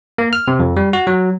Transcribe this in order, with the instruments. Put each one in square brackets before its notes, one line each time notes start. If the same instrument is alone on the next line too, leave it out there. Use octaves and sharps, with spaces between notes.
[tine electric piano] A#3
F6
C3
F2
G3
F#4
F#3